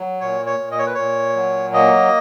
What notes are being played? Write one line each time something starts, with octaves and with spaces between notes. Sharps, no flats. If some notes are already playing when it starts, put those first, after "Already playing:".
Already playing: F#3
A#2 C#5
C#5
A#2
D#5
C#5
B4
A#2 C#5
F#3
A#3 D#5